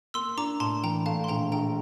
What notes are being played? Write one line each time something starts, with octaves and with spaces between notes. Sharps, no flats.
A#3 C6 E6
D4 A#5 D6
A2 A5 C6
E3 G5 A#5
A3 F5 A5
C6
A#1 G5 A#5
A#1 G5 A#5